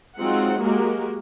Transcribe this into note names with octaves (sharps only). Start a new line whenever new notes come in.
F#3 G#3 C4 D#4 F4 F#5
G#3 A#3 F#4 G4 A#4